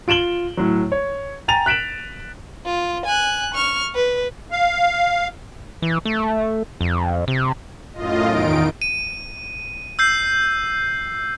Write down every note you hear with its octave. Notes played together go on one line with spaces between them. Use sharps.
F4 D7 E7 F#7 G7
A2 F#3
C#5
G5 G#5 A#5 A6 D#7 F7
F#6 B6 D7 E7 F#7
F4
G#5 F#6
C#6 F6
B4
F5
E3
A3
F2
C3
F#2 A2 F4 D#5
E2 D#3 D#4 D7
D#7
E6 G6 C7